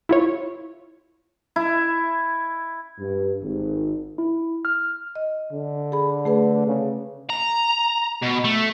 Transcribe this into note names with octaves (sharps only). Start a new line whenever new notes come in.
E4 F4 C#5
E4
G2
G#1
E4
F6
D#5
D3
G#4 B5
A3 G#4 B4
C#3
A#5
B2
A3